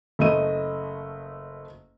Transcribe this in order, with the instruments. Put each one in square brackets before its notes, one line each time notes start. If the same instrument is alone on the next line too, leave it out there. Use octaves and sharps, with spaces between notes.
[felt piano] F#1 A3 D#5 D#7